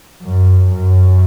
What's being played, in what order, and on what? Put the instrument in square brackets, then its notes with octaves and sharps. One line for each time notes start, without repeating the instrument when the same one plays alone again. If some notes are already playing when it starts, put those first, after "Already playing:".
[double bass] F#2
F#2